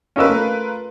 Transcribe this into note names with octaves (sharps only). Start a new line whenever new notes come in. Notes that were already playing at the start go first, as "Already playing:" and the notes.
C#4 F4 A#4 B4 D#5 E6
A3